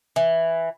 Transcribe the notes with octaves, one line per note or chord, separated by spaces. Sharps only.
E3